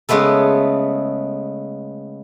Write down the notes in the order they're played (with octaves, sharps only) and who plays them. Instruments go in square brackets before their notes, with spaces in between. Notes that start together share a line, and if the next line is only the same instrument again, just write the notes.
[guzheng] C#3 G#3 A3 B3 A4